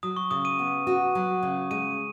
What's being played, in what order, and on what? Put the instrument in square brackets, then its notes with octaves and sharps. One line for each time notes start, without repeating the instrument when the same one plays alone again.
[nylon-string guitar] F#3 [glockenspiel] D#6
[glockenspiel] C#6
[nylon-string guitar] C#3 [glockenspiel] D#6
[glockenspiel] D#7
[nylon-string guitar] B3
F#4
F#3
C#3
[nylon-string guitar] G#3 [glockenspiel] D#7